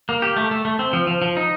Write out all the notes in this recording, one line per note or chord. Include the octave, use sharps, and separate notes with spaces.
A#3
G4
A3
A3
A3
C4
F3
F3
F3
D#4